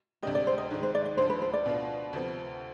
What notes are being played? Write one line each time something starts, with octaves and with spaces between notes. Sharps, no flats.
D2 C3 G3 D4 G4 D#5
D5
C5
D#5
G#2 D#3 G#3
C5
D5
D5
D2 D3 F3 C5
B4
C5
D5
B2 B3 D4 F4
D2 C3 F3 B3